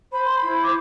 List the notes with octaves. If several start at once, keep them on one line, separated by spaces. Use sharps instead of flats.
C5 B5
C6
E4 B5
D6